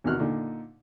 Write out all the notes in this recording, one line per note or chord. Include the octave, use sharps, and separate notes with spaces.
E2 C3 D#3 F#4 F6 F#6
A#2 D3 D#4